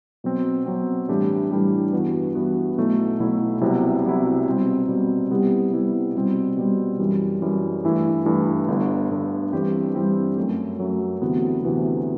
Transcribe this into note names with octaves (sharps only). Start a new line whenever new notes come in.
B2 F#3 C4
B2 F#3 C4
A2 E3 G3 D4 G4
A2 E3 G3 D4 G4
G2 E3 B3 F#4
G2 E3 B3 F#4
B1 B2 F#3 A3 E4
B1 B2 F#3 A3 E4
C2 C3 F#3 B3 E4
C2 C3 F#3 B3 E4
B2 G3 C4
B2 G3 C4
C3 G3 B3 E4 G4
C3 G3 B3 E4 G4
B2 G3 C4
B2 G3 C4
F#2 E3 G3
F#2 E3 G3
G2 E3 A3 E4
G2 E3 A3 E4
G1 G2 D3
G1 G2 D3
G2 E3 G3 C4 G4
G2 E3 G3 C4 G4
F#2 F#3 A3
F#2 F#3 A3
D2 C3 E3 B3 F#4
D2 C3 E3 B3 F#4